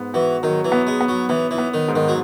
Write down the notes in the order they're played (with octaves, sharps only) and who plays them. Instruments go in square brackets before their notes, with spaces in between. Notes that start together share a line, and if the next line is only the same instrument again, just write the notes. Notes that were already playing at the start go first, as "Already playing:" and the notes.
Already playing: [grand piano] G#2 B3
[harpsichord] E3 [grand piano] F#4
[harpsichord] D#3 [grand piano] F#3
[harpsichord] E3
[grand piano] B3
[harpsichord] G#3
[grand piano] B3
[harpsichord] F#3
[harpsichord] E3 [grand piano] B3
[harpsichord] E3
[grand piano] B3
[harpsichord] D#3
[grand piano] G#2
[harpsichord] D#3
F#3